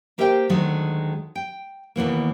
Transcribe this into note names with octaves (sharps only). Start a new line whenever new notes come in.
A#3 G4 A#4 C5 E5 G5
D2 D#3 F#3 G#3 A4
G5
D#2 B2 E3 A#3